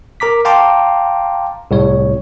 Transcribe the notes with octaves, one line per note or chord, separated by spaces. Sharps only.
A#4 A#5 D6 B6
F5 G5 A5 A#5 C6 D6
C2 A2 C#5